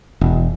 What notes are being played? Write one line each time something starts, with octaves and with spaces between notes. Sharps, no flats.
E1